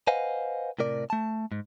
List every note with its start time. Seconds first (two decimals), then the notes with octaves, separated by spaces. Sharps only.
0.07 B4 C5 D#5 F5 F#5 G#5
0.79 A2 C3 A#4 D5
1.10 A3 A5
1.52 G#2